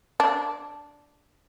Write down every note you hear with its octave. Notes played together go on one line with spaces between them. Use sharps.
D4